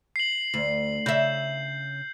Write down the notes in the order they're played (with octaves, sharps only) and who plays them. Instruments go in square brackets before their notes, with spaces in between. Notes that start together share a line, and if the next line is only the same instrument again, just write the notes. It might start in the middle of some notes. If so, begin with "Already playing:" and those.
[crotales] C7 F#7
[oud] D2
[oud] C#3 E5 [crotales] G6